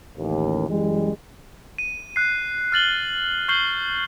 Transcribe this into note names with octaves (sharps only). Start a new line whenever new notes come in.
A1 D#2
F#2 E3 G3 G#3
D#7
F#6 C7
F6 A6 F#7 G7
C#6 F6 G6 C7 F#7 G7